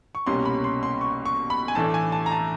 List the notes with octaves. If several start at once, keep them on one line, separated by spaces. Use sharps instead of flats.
C#6
C2 B2 G3 A#3 C#4 C6
B5
C6
C6
C#6
C#6
B5
G#5
A2 E3 A3 D4 A5
G#5
A5
A#5
A5